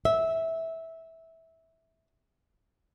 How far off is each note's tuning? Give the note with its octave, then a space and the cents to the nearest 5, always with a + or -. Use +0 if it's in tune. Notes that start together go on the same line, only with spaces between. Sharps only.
E5 -15